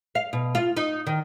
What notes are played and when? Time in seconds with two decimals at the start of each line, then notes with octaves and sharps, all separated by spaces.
0.15 F5
0.33 B2
0.55 F4
0.77 D#4
1.07 D#3